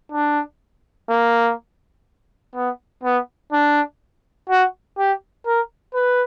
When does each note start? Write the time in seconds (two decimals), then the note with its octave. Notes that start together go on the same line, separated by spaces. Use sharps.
0.12 D4
1.09 A#3
2.55 B3
3.03 B3
3.52 D4
4.49 F#4
4.98 G4
5.46 A#4
5.94 B4